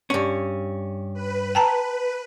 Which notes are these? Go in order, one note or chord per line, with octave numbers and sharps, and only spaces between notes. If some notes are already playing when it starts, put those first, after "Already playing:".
G2 C#4 C#6
B4
G5 A5 A#5